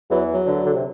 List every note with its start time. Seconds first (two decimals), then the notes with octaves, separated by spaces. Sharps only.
0.10 E2 E3 F#3
0.34 F#3
0.46 D2 D3
0.65 D3
0.74 C3